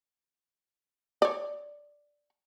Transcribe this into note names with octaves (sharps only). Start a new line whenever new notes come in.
C#5 D5